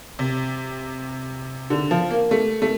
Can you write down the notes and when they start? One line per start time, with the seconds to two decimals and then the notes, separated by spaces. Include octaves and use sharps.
0.19 C3
1.70 D3
1.91 F3
2.10 A#3
2.31 A3
2.62 A3